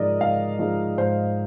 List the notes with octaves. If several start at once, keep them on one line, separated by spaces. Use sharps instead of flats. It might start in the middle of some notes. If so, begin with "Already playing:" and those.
Already playing: G#2 F3 G#3 D#4 A#4 D5 D#5
G#2 F5
F3 G#3 D#4
G#2 C5